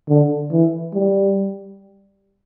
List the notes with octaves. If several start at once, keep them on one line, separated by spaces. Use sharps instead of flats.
D3
E3
G3